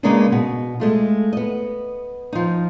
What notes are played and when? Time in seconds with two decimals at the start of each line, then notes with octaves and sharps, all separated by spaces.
0.03 C#3 G#3 A#3 B3 D4 D#4
0.32 B2
0.80 G#3 A3 F4
1.33 B3 D#5
2.33 F3 D#4